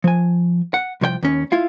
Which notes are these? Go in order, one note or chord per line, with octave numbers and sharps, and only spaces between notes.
F3 G#5
F#5
C2 F3 C#5 G5
D#2 C#4
E4 F4 F5